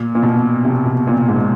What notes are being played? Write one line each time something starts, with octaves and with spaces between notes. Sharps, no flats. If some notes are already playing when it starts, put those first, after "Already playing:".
Already playing: A#2
A#2
B2
C3
B2
A#2
G#2